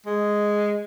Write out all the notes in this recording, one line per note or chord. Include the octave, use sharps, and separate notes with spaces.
G#3